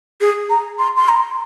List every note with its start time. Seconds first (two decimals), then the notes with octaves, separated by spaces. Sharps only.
0.21 G#4
0.50 A#5
0.79 C6
0.97 C6
1.09 A#5